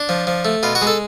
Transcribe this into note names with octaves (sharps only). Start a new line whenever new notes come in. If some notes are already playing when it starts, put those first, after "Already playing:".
Already playing: D4
F3
F3
A3
B2 F4
F#4
G#3
A4